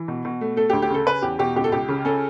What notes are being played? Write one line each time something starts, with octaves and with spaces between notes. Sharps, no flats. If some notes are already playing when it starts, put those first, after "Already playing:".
Already playing: E3
B2
B2
A3
A3 A4
D2 G4
G4
C#3 A4
C#4 B4
E2 G4
B2 G4
C#2 G4
A4
C#2 G4
C#3
C#4 A4